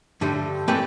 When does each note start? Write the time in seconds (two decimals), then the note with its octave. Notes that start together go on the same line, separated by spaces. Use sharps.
0.21 G2 D3 G3 A3
0.68 E3 A3 C4 G4 B4 D5